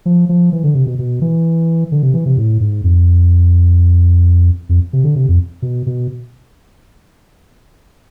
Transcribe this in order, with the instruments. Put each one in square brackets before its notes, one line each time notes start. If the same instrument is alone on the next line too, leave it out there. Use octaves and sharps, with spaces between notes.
[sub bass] F3
F3
E3
D3
C3
B2
B2
E3
D3
C3
E3
C3
A2
G#2
F2
F2
C3
D3
C3
F2
B2
B2